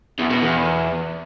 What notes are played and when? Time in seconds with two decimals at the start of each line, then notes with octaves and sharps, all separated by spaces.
0.19 E2
0.30 B2
0.42 E2